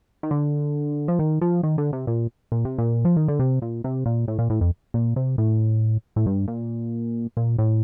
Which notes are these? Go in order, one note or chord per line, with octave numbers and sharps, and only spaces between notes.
D#3
D3
F3
D#3
F3
D#3
D3
C3
A#2
A#2
C3
A#2
F3
D#3
D3
C3
A#2
C3
A#2
A2
A#2
A2
F2
A#2
C3
A2
A2
G2
A#2
A#2
A2